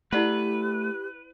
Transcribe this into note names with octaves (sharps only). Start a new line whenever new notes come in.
A3 E4 G4 B4 D5 F#5